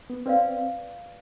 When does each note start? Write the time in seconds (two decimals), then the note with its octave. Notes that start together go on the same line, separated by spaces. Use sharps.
0.10 B3
0.26 C4 B4 D5 F5